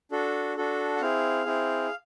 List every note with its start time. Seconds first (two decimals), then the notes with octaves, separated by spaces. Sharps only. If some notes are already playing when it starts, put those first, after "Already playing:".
0.11 D4 F#4 A4
0.57 D4 F#4 A4
0.96 F#5
1.01 C4 E4 G#4 F5
1.45 C4 E4 G#4